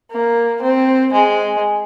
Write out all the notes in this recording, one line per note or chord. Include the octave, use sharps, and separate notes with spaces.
A#3
C4
G#3